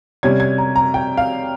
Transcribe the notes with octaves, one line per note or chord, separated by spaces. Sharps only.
C3 G3 C#4 G#6
G#6
A#5
A#5
G5
F5